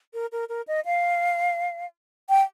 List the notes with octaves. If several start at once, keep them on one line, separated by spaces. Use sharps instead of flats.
A#4
A#4
A#4
D#5
F5
G5